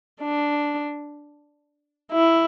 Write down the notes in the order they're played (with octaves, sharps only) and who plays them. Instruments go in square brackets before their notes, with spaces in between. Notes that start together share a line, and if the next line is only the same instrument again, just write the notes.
[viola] D4
E4